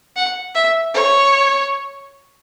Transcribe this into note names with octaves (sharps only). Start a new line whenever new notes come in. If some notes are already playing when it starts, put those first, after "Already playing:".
F#5
E5
C#5